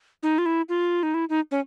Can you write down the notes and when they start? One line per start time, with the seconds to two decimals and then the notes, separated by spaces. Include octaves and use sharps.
0.23 D#4
0.38 F4
0.46 E4
0.69 F4
1.03 D#4
1.14 E4
1.29 D#4
1.51 C#4